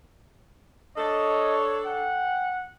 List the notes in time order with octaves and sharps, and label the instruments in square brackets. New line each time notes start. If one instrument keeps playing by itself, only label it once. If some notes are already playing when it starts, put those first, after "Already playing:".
[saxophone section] D4 A4 [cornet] C#5 [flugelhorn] D#5
[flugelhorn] F#5 [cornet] G5